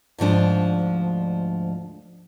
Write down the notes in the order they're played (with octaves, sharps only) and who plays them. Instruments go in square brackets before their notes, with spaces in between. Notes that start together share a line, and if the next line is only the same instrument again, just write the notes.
[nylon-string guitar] D2 G#2 F3 D4